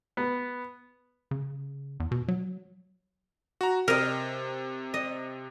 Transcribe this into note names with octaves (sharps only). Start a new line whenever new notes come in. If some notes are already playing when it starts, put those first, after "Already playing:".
B3
C#3
E2
B2
F#3
F#4 A#5
C3 A#4 D#5
D#5